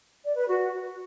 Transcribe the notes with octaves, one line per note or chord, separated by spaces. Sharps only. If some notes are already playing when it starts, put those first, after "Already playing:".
D5
B4
F#4